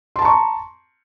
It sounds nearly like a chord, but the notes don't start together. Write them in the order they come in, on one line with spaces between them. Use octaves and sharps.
C6 A5 A#5 C#6